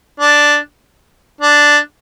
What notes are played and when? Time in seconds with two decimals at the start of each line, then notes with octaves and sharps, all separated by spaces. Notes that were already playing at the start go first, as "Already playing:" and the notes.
0.20 D4
1.41 D4